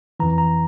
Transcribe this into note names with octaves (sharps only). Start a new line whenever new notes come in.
F2 E3 A#5
A#5